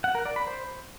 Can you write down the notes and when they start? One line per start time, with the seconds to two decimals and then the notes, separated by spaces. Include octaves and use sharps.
0.04 F#5
0.15 A#4
0.25 D5
0.36 B5
0.47 C5